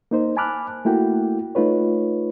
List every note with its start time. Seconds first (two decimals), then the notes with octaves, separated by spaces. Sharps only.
0.11 A#3 D#4 C5
0.37 G#5 A5 B5 D6 F6 F#6
0.85 A3 A#3 E4 F#4 G5
1.55 A3 D#4 F4 B4 C#5